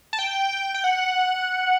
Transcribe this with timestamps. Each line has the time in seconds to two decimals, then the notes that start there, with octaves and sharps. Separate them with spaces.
0.13 A5
0.19 G5
0.74 G5
0.84 F#5